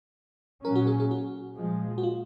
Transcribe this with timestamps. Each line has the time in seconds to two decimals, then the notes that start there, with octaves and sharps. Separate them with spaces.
0.64 A#2 F#3 C#4 A#4
0.76 F#4
0.87 G#4
1.00 G#4
1.11 F#4
1.57 A#2 F3 G#3
1.98 F#4
2.03 F4